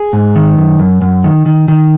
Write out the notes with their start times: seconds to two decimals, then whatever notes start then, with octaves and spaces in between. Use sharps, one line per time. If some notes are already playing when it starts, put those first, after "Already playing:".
Already playing: G#4
0.13 G#2
0.36 D#3
0.58 F#2
0.79 F#2
1.02 F#2
1.24 D#3
1.46 D#3
1.68 D#3